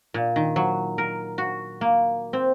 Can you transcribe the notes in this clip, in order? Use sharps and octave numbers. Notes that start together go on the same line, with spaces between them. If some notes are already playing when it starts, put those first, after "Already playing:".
A#2
D#3
F#3
A#4
F#4
A#3
C4